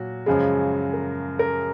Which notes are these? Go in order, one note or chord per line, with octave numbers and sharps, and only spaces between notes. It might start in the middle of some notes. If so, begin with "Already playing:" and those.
Already playing: A#2 F#3 F#4
F#2 C#3 F3 G#3
A#4
A#4